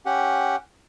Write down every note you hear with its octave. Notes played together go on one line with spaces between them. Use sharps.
C#4 G4 F#5